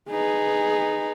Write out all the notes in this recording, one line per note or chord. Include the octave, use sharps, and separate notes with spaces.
D#4 G#4 B4